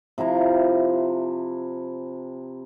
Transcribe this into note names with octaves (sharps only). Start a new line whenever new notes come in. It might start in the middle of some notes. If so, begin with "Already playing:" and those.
C3 F3 E4 A#5